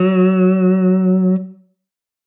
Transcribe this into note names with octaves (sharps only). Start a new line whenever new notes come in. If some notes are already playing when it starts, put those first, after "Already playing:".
Already playing: F#3